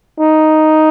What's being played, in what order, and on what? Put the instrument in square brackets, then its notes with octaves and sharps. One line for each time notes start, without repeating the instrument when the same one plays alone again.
[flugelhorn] D#4